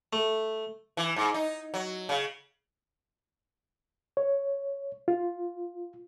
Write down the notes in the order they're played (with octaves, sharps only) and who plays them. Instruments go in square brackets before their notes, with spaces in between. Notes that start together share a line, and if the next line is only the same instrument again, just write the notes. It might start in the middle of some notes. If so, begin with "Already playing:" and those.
[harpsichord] A3
[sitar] E3
G#2
D#4
F#3
C#3
[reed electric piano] C#5
F4